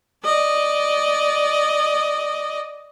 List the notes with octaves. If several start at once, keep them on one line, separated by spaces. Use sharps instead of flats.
D5 D#5